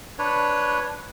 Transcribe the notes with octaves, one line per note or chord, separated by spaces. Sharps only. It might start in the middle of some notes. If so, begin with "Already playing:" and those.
D4 B4 C#5